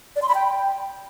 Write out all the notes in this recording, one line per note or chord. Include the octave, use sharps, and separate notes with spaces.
D5
C6
B5
G5